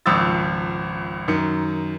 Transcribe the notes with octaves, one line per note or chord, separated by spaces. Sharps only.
G#1 C#2 F3 D#6 E6 A6
F#2 D#3 C#7